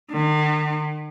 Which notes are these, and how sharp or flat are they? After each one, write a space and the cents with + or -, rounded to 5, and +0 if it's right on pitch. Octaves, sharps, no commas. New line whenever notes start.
D#3 -40